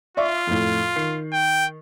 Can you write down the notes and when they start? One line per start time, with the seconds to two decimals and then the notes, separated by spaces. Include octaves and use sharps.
0.17 F4 D5 E5 C#6
0.47 F2 A2
0.96 D#3 C7
1.33 G5